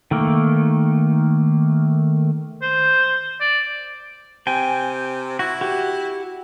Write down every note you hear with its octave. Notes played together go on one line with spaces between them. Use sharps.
D#3 A3 A#3
C5
D5
C3 G5 G#5
E4 F#4
F#4 G4